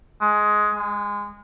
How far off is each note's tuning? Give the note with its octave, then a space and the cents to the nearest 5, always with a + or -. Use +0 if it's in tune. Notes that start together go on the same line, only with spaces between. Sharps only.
G#3 +10
G#3 -20